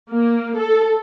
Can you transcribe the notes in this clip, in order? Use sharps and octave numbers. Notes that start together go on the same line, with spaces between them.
A#3
A4